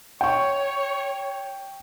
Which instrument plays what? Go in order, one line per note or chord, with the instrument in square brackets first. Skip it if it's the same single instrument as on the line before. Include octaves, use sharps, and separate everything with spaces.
[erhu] C#5 [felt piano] G5 C#6